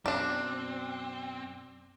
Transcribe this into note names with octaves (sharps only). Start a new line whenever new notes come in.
F#2 B2 C4 D4 D5